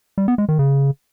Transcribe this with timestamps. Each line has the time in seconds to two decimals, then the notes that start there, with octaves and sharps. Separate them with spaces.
0.18 G3
0.28 B3
0.38 G#3
0.49 D#3
0.59 C#3